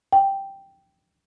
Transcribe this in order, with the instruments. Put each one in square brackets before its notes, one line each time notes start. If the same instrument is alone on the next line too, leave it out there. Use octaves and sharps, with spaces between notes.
[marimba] G5